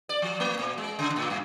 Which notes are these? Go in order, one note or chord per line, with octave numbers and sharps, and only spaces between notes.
D5
F3
A3
A#2
G#3
C#3
A2
G2